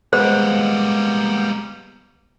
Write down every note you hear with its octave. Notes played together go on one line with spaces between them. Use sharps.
G3 G#3 A#3 B3 C5